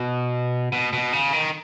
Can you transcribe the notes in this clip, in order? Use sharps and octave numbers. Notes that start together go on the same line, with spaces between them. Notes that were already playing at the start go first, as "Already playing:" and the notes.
Already playing: B2
B2
B2
C#3
D#3